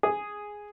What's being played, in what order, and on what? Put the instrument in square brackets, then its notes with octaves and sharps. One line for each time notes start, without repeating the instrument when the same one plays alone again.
[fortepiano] G#4